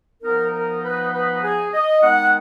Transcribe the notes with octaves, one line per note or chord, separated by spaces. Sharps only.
F3 B3 D#4 A#4
A#4
B4
B4
G#4
D#5
D#3 G#3 B3 D#4 F#5